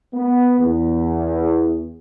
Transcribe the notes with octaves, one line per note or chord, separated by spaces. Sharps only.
B3
E2